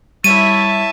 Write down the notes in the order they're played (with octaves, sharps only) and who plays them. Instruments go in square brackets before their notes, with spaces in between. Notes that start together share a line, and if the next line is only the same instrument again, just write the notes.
[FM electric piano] G3 [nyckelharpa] E4 C#5 [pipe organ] E5 A5 [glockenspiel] D#7